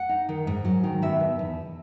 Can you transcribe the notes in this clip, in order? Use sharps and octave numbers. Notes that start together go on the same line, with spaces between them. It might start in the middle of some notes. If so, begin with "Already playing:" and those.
Already playing: F#5
D#4
D#3
G#2
F#3
D#3
B2 E5
B2
E2